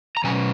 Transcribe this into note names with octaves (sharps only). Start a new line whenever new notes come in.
A#5
B2 F#3 C#4 G#5